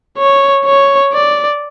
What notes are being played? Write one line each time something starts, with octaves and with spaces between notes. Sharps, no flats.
C#5
C#5
D5